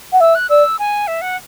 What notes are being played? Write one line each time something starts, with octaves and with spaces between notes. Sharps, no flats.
F#5
E5 E6
F#6
D5 E6
G#5
E5
F#5